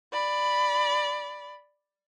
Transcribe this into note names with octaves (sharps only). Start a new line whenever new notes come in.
D5 B5